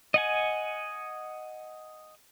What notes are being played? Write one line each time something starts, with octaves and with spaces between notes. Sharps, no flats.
D#5 F#5 G#5